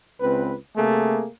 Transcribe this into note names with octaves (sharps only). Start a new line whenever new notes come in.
C#2 C4 B4
C3 A3 A#3 G#4